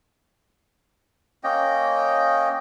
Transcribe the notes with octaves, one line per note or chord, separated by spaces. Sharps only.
A#3 C#4 D#5 G5